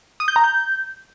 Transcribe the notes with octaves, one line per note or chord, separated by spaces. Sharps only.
D#6
G6
A#5
G6